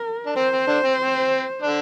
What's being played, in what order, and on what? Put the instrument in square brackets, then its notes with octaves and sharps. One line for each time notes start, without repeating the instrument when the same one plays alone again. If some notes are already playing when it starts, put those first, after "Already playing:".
Already playing: [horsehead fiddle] A#4
[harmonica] D4
[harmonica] C4 [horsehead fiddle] C5
[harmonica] C4
D3 D4
C4
C4
D3 D4